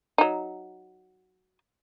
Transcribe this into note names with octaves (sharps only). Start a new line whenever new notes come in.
F#3 D#4